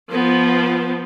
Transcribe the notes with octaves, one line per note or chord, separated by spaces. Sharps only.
F3 B3